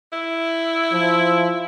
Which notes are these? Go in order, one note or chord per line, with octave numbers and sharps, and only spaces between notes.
E4
F3